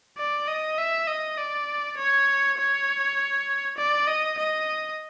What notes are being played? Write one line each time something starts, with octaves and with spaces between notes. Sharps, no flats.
D5
D#5
E5
D#5
D5
C#5
C#5
D5
D#5
D#5